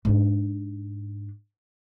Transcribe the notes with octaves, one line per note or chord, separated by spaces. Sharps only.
G#2 D4